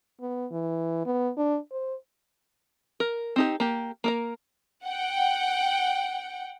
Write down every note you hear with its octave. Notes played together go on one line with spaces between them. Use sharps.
B3
E3
B3
D4
C5
A#4
C4 D#4 G4
A#3 G4
A#3 A#4 A#5
F#5 G5